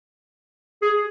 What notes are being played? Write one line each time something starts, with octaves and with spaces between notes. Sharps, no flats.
G#4